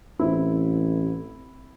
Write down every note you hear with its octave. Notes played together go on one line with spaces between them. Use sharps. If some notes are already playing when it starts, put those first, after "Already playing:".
A1 C4 E4